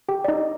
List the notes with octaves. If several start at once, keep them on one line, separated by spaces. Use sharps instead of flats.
G4 G5
D5
D#4 D#5